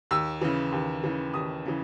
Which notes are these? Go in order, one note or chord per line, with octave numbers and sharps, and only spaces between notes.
D#2 E6
C#3 E3
D#2
C#3 E3
D#2 D#6
C#3 E3